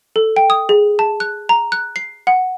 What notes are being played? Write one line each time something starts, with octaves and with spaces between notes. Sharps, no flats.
A4
G5
D#6
G#4
A5
F#6
A#5
F#6
C7
F#5